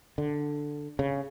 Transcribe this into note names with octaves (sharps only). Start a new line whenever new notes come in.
D3
C#3